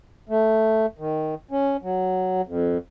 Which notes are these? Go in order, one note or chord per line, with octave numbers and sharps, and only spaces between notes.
A3
D#3
C#4
F#3
F2